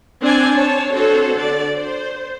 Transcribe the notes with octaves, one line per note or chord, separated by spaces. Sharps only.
C4 D4 C5 D5 G#5
D4 C#5 A5
C4 D4 F#4 A4 C5 C#5
D3 D5
C5